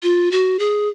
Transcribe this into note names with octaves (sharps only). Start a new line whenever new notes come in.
F4
F#4
G#4